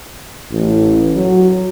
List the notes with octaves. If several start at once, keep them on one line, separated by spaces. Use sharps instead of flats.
A1
F#3